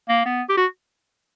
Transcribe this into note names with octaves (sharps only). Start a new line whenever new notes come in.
A#3
B3
G4
F#4